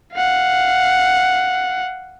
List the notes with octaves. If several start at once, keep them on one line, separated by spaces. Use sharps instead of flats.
F5 F#5